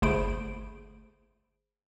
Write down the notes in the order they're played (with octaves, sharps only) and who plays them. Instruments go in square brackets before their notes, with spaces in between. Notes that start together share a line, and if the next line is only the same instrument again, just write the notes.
[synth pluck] G1 A3 G#4 C5 B5 D7